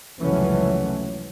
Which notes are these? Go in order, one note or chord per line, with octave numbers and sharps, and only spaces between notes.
F1 C#2 E3 F#3 A3 C#4